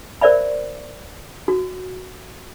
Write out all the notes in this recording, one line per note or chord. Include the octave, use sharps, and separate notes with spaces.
A#4 C5 D5 E5 B5
F#4